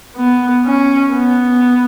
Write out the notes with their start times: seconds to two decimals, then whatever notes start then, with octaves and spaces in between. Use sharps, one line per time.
0.16 B3
0.65 C#4
1.14 B3